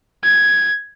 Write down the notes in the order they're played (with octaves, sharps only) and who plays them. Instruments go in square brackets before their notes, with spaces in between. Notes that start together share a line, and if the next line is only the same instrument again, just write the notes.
[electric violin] G#6